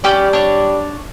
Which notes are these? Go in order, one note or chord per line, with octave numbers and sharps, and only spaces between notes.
G3 C#4 G4 D5
D4 C#5